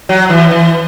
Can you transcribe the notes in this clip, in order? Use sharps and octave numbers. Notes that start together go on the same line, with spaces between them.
F#3
E3
E3